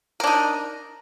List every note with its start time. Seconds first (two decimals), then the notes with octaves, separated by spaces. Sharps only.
0.20 A#4
0.24 D4
0.27 D#4